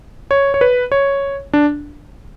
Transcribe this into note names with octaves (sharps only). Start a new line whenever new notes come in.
C#5
C#5
B4
C#5
D4